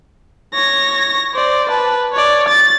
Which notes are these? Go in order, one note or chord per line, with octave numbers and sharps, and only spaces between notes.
C#5 A#6
C5 D5
B4 A5
C#5 D5
A6